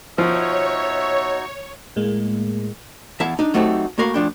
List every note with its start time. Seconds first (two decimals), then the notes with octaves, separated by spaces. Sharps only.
0.18 B2 F3 D#4 F#4 C#5 E5
1.96 A2 G#3 A#3
3.20 E2 E4 E5 F5 A5
3.39 D4 D#4
3.54 F#3 A3 C4 D#4 G4 A4
3.98 A2 A#3 F#4 A#4 F5 B5
4.14 A2 F3 D4 G5